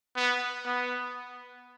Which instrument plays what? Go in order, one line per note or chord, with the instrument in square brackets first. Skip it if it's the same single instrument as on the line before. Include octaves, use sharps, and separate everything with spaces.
[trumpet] B3
B3